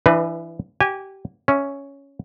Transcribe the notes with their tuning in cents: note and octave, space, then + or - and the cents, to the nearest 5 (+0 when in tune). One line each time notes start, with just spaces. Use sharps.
E3 +20 D4 +45 B4 +0
G4 -20 G#5 -25
C#4 +5 E5 +0